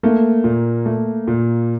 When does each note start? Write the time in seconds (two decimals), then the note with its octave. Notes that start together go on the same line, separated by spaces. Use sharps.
0.03 A3 A#3
0.44 A#2
0.86 A3
1.28 A#2